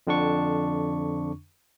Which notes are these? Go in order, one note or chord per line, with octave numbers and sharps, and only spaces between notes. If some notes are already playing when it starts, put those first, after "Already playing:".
F2 D3 D4 C#6